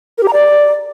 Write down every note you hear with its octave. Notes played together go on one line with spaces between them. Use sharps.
A#4
G4
A#5
D5